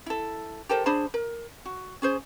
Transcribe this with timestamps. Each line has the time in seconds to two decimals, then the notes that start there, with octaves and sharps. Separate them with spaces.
0.06 E4 A4
0.69 G4 A4 A#4 C5
0.86 D4 G#4 C5 B5
1.14 A#4
1.66 F#4
2.02 C#4 G#4 C5